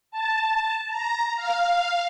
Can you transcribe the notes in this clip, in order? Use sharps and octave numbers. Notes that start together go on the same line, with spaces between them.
A5
A#5
F5